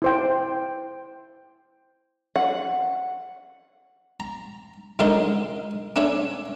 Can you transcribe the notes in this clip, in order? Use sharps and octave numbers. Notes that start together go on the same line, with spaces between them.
E4 C5 G5
F#5
A#5
C#2 D3 G#3 D#4 A#4 D#5
A3 C#4 D4 C#5 E5